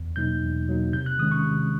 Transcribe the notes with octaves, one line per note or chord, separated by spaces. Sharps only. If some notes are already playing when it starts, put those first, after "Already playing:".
Already playing: E2
B2 F#3 A#3 D#4 G6
E2
B2 F#3 A#3 D#4
C3 G6
F#6
D#3 G#3 C#4 D#6
C#6
C3